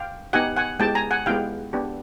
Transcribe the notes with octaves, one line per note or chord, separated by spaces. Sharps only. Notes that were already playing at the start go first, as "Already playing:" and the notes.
Already playing: F5 G5
B3 D#4 G4 F#5 G#5
F#5 G#5
G#3 B3 E4 G4 G5 A5
G#5 A#5
F#5 G#5
G#3 B3 E4 G4 F5 G5
B3 D4 G4